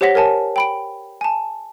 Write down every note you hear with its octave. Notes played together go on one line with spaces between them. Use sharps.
G4 C5 C#5 F#5 A#6 B6
A#4 C#5 G#5 A5
G5 B5 D7
G#5 A5